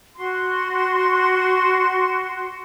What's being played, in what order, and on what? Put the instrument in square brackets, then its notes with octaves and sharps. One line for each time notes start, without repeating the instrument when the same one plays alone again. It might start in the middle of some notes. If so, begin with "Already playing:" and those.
[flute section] F#4 C6